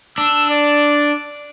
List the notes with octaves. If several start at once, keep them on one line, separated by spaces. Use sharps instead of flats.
D4 E6
D5